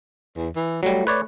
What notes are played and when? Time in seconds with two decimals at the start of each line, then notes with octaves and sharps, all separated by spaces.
0.37 E2
0.56 E3
0.83 F#3 G3 A3
1.07 B4 C#5 D5